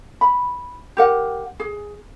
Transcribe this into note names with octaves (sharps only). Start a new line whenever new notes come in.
B5
G4 A#4 F#5
G#4